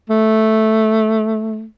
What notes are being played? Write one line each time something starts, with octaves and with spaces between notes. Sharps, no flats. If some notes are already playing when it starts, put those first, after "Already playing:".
A3